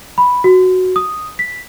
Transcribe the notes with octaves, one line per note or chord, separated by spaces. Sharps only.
B5
F#4
D#6
B6